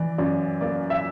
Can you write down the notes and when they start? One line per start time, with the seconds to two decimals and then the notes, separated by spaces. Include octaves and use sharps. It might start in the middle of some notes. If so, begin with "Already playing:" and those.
Already playing: E3 D5
0.18 F#2 D5
0.61 A#3 D5
0.90 E5